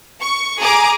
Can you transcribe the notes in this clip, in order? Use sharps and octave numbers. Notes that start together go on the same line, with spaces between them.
C#6
G#4 A#5 D6